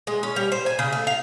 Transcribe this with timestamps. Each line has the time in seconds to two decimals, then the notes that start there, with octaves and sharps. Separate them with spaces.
0.07 G#3
0.23 C#4
0.36 G3
0.52 C5
0.66 G#5
0.79 C#3
0.92 A3
1.07 F5